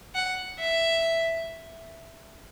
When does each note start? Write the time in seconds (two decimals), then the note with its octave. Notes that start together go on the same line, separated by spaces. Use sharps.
0.15 F#5
0.59 E5